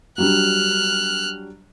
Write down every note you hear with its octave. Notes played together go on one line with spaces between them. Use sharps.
F#3 G3 D4 F6 F#6